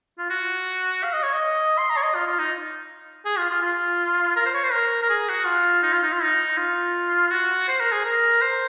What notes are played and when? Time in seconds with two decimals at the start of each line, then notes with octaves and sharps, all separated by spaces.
0.19 F4
0.30 F#4
1.03 F5
1.13 D#5
1.23 C#5
1.33 D#5
1.78 C6
1.90 A#5
1.97 C#5
2.03 D#5
2.15 F4
2.27 F4
2.39 D#4
3.25 G#4
3.38 F4
3.50 F4
3.62 F4
4.36 A#4
4.46 C5
4.54 C#5
4.64 C5
4.72 A#4
5.03 A#4
5.10 G#4
5.29 F#4
5.46 F4
5.83 D#4
5.93 F4
6.03 D#4
6.13 F4
6.23 D#4
6.57 F4
7.31 F#4
7.68 C5
7.80 A#4
7.92 G#4
8.05 A#4
8.42 C5